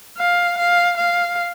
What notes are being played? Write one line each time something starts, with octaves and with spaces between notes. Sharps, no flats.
F5
F5
F5